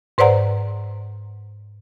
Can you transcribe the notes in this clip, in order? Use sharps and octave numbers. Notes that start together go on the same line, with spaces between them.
G#2 B4 C5 D5 F#5 A#5